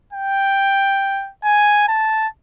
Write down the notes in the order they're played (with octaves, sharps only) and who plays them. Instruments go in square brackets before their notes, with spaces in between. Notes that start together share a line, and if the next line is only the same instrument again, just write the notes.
[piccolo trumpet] G5
G#5
A5